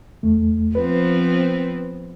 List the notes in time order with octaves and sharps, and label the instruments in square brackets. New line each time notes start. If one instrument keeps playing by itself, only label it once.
[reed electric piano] E2 A3
[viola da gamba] F3 B3 C4 [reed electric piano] B4